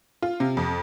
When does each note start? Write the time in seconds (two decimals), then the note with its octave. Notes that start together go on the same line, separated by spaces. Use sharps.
0.22 F4
0.40 C3
0.57 F2